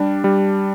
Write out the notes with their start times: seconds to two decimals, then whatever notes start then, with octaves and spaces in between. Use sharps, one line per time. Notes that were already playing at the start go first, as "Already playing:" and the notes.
Already playing: G3 D4
0.24 G3